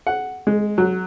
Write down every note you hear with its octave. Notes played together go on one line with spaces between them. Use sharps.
F#5
G#3
F#3